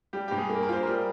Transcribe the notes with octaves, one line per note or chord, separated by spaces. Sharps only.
G3 G4
G2 G4
G#4
A#3
A#4
F4 C5
G3 A#4